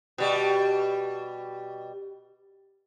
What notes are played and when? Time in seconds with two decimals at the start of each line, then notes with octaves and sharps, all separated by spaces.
0.18 B2 G3